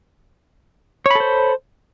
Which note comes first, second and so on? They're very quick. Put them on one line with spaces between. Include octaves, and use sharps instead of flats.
C#5 B5 A4 C5